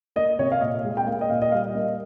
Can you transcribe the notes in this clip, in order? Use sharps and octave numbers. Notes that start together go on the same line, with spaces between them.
A#3 D#5
C3 C#5
F5
A#2 D#5
G#3
G5
A#3 F5
D#5
A#2 F5
D#5
G3 F5
A#3 D#5